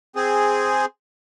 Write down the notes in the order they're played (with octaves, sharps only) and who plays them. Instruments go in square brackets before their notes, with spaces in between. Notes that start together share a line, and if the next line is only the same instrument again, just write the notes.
[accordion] C4 G#4